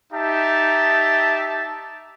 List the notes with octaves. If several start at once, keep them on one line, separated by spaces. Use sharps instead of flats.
D#4 G4 E5 A5